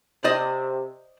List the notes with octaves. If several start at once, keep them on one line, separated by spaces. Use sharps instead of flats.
C3 C5 D5 D#5